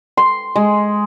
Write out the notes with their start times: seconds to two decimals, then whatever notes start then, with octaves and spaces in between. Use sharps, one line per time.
0.17 C6
0.56 G#3